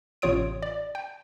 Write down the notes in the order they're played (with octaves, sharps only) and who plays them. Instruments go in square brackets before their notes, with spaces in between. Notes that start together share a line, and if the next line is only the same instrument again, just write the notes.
[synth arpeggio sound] A1 C3 F4 C#5 D#6 D7
D5
G5